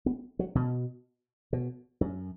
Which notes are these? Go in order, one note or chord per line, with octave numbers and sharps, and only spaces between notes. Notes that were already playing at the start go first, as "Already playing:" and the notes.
B3
F#3
B2
B2
F#2